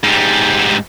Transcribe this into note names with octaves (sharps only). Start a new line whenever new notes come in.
G#2 G3